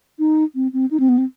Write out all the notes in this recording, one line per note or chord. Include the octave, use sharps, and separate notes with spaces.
D#4
C4
C4
D#4
C4
B3
C4